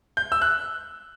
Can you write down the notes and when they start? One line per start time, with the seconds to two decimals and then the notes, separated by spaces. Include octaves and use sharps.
0.17 G6
0.32 E6
0.42 F#6